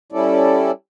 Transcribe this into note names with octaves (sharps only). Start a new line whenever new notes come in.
G3 C#4 E4 A4 D5